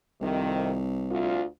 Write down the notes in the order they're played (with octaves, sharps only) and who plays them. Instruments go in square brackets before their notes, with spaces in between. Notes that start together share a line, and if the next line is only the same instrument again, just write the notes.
[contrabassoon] C2 [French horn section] F2 C3 D#3
[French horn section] D2 F4